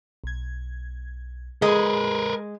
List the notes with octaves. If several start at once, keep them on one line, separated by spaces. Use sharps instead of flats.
B1 G#6
G#3 G#4 A#4 B4